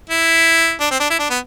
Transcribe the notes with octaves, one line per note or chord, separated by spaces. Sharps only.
E4
D4
C4
D4
E4
D4
B3